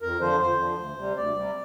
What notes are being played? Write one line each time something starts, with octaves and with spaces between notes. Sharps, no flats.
F2 A#4
D3 F3 C5
F2 C5
D3 F3
D2
C3 G3
D2 D5
C3 G3